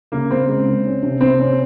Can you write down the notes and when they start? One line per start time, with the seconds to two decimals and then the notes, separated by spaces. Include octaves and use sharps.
0.12 C#3 A#3
0.31 C#3 C4
0.48 G#3
0.67 C#3
0.85 C#4
1.03 C3
1.21 C3 C4
1.39 C#4